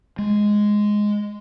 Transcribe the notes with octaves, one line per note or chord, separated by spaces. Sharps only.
G#3